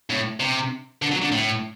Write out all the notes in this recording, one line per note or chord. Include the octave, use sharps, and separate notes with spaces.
A2
C3
D3
F#3
D3
A2